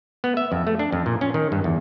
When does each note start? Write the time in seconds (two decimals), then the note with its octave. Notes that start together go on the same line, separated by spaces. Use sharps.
0.24 B3
0.37 E5
0.52 F2
0.67 A3
0.79 D4
0.92 F2
1.06 A#2
1.21 C#4
1.34 D#3
1.52 G2
1.64 E2